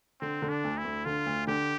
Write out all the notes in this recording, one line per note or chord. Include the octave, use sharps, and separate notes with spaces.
D3 C4
D3
D4
D2
E4
D2
D3 F4
D2
D3 G4